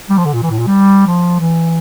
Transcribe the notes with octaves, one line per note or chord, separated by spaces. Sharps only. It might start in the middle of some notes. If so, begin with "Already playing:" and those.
G3
F3
D3
A#2
E3
A2
A#2
G3
F3
E3